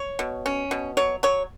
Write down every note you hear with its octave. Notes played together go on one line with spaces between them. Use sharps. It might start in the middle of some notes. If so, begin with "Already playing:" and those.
Already playing: C#5
B2
C#4
B2
F#3 C#5
F#3 C#5